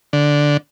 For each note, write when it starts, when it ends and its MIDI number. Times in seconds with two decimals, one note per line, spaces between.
0.13 0.57 50